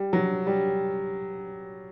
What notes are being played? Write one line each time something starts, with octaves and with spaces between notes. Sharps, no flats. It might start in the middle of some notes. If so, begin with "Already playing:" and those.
Already playing: G3
F#3
G3